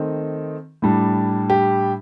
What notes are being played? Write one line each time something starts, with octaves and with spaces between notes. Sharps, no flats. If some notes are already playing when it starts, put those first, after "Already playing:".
Already playing: D#3 A3 C4 D#4
A2 G3 D4
G4